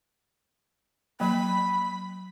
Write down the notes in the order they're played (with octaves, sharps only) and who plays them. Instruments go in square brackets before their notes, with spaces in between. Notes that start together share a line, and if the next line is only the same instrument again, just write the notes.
[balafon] F#3 A#3 [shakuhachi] B5